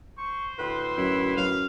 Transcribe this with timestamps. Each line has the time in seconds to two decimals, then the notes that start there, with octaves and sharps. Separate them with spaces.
0.18 C5 C#6
0.59 D2 A2 B4 C6
0.97 F#2 E4
1.37 F#2 F5